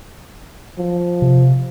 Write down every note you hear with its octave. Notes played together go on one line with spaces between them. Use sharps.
F3
C3